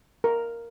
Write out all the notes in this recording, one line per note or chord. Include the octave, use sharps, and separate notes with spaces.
A#4